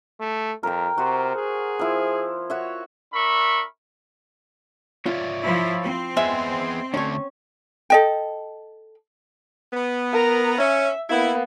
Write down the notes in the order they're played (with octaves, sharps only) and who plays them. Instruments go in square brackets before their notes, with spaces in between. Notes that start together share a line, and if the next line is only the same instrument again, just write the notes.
[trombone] A3
[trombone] F2 [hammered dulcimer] A#4 G5
[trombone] C3 [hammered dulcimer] F#4 C5
[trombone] G#4
[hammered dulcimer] F3 E4
F#4 C#5 E5
[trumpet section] D4 A#4 E5 B5 C#6
[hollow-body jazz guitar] F4 [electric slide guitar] C#5 D5 E5
[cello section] F3 E4
C4
[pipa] G#3 E5 [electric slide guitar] B3 G#4 B4
[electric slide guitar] D3 A3 D4 [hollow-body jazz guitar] C#4 C#5
[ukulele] A4 D#5 G5
[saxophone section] B3
[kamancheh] A#4 A#5
[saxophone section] C#4 [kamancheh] E5
[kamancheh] A#3 B3 [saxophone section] E4